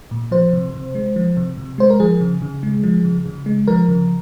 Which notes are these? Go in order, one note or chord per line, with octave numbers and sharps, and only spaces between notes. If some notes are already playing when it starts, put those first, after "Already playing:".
A#2
F3 C5
C3
C3
G#3
F3
C3
C3
G#3 C5
A#4
F3 G#4
C#3
C#3
G#3
F3
C#3
C#3
G#3
F3 A#4
C#3